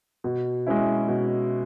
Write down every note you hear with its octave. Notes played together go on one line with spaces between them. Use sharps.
B2
G#3 C#4 E4
B2